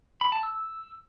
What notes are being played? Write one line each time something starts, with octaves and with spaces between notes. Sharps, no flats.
B5
A5
E6